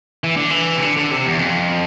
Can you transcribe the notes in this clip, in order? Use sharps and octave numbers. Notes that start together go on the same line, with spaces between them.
E3
D3
E3
C3
D3
D3
C3
E2
F2